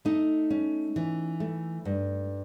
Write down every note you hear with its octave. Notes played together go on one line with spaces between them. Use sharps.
A3 D#4
C#4
E3
A3
G2